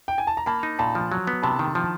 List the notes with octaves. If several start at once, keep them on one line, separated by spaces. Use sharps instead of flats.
G5
G#5
A5
A#5
A#3 A5 B5
D#4
A#2 A5 B5
F3
F#3
B3
C3 A5 B5
D#3
F3